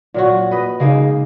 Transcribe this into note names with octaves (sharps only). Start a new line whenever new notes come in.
A#2 F#3 F#4
B4 D#5
C#3 G#3 A#3 D#4